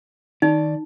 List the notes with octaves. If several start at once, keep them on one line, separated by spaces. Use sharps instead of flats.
D#3 D#4 D5